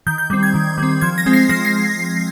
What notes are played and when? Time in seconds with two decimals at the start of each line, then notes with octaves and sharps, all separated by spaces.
0.07 D#3 G6
0.18 G6
0.30 G3 C4 G6
0.43 G#6
0.54 D#3
0.78 G3 C4
1.01 F3 G#6
1.18 A#6
1.26 G#3 C4
1.33 C7
1.49 F3 A#6
1.65 C7